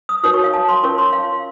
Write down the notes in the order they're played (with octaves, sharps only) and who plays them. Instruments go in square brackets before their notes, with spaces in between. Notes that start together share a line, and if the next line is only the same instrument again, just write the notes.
[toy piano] D#6
D#4 F#4 A#4 C#5 D#6
C#6
F5
A5
C6
C#4 F4 A#4 C#5 C#6
C6
F5